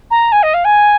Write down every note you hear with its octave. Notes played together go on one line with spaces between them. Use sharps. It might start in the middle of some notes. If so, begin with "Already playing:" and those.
A#5
G#5
D#5
F5
G#5